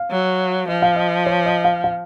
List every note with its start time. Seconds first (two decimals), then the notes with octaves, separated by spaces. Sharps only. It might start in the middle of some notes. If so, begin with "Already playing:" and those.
Already playing: F5
0.11 F#3
0.68 F3 D#5
0.82 F5
0.96 D#5
1.26 C#5
1.46 D#5
1.65 F5
1.84 F5